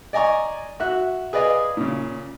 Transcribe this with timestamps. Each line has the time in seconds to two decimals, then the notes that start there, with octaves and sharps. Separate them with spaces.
0.13 D5 D#5 G#5 A#5 C#6
0.80 F#4 E5 F#6
1.33 G#4 B4 D5 D#5 F5 G#5
1.77 A#2 C#3